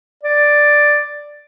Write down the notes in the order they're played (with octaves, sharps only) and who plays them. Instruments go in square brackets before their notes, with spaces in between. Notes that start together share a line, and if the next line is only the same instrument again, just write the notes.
[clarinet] D5